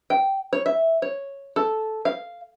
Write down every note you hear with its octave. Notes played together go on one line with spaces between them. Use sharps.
G5
C#5
E5
C#5
A4
F5